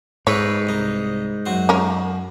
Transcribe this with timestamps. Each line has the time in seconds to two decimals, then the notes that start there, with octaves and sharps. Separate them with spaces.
0.27 G#2 A4 B4 C#5
0.67 C2 D#4
1.46 F#2 F#4 C6
1.69 C#4 A#4